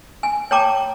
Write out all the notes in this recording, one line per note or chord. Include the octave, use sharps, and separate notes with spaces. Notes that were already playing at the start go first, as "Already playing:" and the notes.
G#5
C#5 G5 A5 A#5 D6